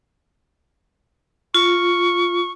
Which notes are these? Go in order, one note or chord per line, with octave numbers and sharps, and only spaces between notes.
F4 C#6